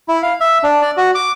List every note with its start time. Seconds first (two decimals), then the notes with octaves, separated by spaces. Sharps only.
0.08 E4
0.22 F5
0.40 E5
0.64 D4
0.82 D5
0.97 F#4
1.15 D6